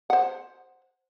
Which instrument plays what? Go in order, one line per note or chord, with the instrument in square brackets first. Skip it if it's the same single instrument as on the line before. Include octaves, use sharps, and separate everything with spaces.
[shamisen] C5 F#5